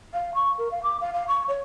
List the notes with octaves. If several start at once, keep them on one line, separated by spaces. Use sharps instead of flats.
F5
C#6
A#4
F5
D6
F5
F5
C#6
C#5